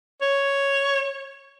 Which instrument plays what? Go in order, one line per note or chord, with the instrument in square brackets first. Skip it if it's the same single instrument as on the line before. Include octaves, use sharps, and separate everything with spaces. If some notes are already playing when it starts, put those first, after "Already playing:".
[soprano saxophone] C#5